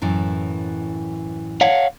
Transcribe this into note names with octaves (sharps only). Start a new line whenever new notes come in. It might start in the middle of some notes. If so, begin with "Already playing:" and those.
F#2 A2 E3
C#5 F5 F#5